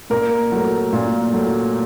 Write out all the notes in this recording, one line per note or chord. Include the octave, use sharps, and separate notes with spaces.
A#2 A#4
F#3 A3
A#2
F#3 A3